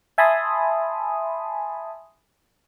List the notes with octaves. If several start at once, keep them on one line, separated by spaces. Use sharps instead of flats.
E5 G#5 A5 B5 C6 D#6